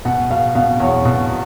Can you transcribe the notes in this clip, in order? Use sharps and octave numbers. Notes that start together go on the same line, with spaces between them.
B2 F#5
B2 F5
B2 F5
E2 C#5
B2